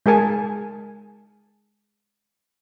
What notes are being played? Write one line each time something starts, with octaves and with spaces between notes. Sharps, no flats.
G#3 G#4 A#4 G#5 A5